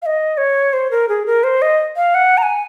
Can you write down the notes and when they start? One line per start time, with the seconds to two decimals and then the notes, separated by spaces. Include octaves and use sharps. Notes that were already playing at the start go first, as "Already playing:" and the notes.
0.02 F5
0.06 D#5
0.38 C#5
0.73 C5
0.91 A#4
1.09 G#4
1.26 A#4
1.44 C5
1.62 D#5
1.96 F5
2.15 F#5
2.38 A#5
2.43 G#5